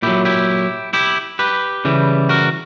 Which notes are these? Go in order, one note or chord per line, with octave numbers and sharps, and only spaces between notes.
A#2 F#3 E4 G4
E4 G4
E4 G4
G4 B4
C#3 E3 G3
F#4 A#4